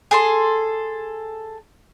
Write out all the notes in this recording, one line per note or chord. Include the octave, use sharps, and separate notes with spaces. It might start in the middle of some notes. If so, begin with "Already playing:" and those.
G#4 A4 C6